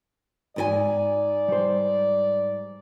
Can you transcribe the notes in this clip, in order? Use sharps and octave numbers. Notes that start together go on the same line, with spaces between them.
G#2 B4 D5 G#5
G3 C5